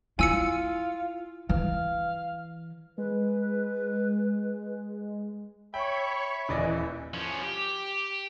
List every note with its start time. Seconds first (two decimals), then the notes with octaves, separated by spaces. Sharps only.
0.19 E4 F4 G#5 E6 C#7
1.49 E3 F5
2.98 G#3 B4
5.74 C#5 E5 G5 B5 C#6
6.49 D#1 E3 D5 D#5
7.14 F3 C#4
7.44 G4